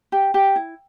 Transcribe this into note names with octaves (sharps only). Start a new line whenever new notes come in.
G4
G4
E4